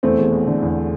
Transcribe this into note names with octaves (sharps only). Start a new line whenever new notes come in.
E2 A3 C4
E1
E2
D3
E2